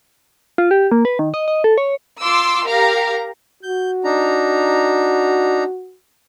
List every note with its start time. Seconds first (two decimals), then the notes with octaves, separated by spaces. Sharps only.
0.58 F4
0.71 G4
0.92 A#3
1.05 B4
1.19 D#3
1.34 D#5
1.48 D#5
1.64 A4
1.78 C#5
2.21 F4 C6 D6 E6
2.67 G4 A#4 F5 A#5
3.63 F#4 G6
4.04 D4 D#4 A#5